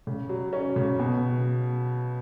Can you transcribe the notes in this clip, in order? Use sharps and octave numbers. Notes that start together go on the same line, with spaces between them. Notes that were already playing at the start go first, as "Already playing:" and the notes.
C#3
F#3
C#4
C#3
B2